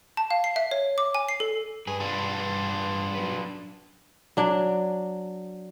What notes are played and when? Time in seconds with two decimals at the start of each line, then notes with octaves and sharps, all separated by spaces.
0.17 A5
0.31 F5
0.44 C7
0.56 E5
0.71 C#5
0.98 D6
1.15 G#5
1.29 C7
1.40 A4
1.87 G2 G#4 B4
2.00 D4 F4
3.15 F#3 B4
4.37 F#3 D4